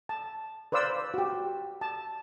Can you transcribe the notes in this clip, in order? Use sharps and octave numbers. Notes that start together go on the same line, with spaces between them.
A5
B4 C5 D5 F5 E6
F#4 G4
A5